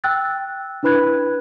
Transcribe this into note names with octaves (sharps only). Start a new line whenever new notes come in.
G5 E6 F#6 A6
D4 E4 B4 B5 F#6 G#6